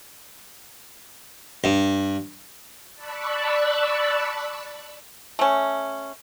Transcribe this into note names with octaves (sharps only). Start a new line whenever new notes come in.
G2
D5 A5 B5 C#6 E6 F#6
A3 C#4